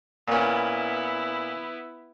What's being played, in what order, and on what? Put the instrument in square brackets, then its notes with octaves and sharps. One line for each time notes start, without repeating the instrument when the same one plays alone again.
[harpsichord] A#2 C#4 [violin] B3 E4